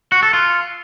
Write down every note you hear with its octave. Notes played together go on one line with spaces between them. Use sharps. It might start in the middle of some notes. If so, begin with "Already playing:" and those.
F#4
A4
F4